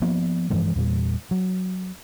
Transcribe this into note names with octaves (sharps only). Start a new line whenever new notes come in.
F3 A#3 B3
G2 E3 F3 G#3
E2 A#2 G3
F#3